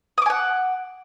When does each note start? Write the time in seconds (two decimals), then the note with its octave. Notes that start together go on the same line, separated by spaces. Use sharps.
0.18 D#6
0.22 D6
0.26 G#5
0.30 F#5